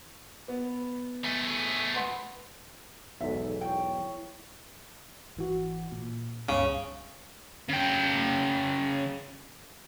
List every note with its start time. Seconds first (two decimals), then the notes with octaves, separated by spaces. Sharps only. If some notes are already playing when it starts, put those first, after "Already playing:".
0.48 B3
1.24 A3 G#4
1.94 B4 F#5 C6
3.21 B1 E2 G#2 A4 E5
3.61 E4 C#5 G5 C#6
5.36 G#1 E3 F#4
5.92 A#2
6.49 C#2 G2 C#3
7.69 C#3 G5